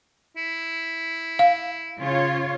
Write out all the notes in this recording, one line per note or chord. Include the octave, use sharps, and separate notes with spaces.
E4
F5
C#3 F4 C#5